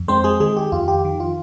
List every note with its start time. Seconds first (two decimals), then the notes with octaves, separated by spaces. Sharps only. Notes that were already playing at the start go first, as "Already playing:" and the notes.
Already playing: F2
0.08 G#3 C4 C5
0.24 G#3 G#4
0.40 D#3 G#3 G#4
0.57 G4
0.72 F2 F4
0.88 G4
1.05 D#3
1.20 F4